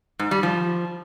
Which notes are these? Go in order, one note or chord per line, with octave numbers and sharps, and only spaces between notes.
G#2
G3
F3